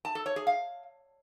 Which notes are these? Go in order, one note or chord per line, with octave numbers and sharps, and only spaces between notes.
A5
A4
C#5
G#4
F5